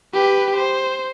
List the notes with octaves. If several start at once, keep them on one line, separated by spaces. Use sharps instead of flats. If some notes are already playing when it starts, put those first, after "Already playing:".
G4 B4
C5